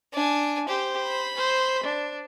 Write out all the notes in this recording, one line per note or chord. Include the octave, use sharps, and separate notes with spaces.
D4 G#5
G4 C5
B5
C5
D4